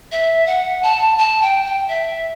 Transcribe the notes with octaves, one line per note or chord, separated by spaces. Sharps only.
E5
F#5
A5
A5
G5
G5
E5